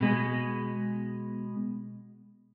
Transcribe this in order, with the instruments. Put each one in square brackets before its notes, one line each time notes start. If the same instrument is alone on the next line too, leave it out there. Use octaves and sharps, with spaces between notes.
[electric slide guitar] B2 G#3 B3